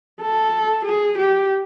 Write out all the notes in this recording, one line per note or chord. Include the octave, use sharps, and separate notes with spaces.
A4
G#4
G4